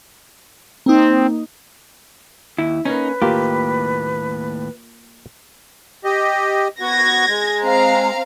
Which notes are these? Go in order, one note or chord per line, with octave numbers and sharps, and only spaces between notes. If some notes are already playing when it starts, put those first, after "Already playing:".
A#3 C4 D#4
D#2 E4
A#3 C#4 D#4 B4
D#2 A2 A#3 F4 G4
G4 D#5
B3 F#4 G#6 A#6
G#3
C4 F5 A#5